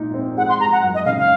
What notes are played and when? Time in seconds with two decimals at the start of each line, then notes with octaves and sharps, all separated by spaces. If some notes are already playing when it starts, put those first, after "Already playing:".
Already playing: A#2 G#3 D#4
0.14 C4
0.37 G#3 F#5
0.49 C6
0.60 G#3 A#5
0.72 F#5
0.83 F#2
0.94 D#5
1.05 C#3 F5
1.17 F5